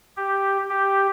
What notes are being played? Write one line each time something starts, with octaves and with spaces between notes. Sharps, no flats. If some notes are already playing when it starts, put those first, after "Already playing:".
G4
G4